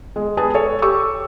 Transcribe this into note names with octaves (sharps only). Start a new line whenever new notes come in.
G#3
G#4 B4 G#5 A5
A4 C#5
G4 C#6 E6